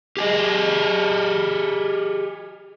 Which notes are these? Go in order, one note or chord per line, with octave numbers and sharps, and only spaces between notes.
G4 G#4 D#5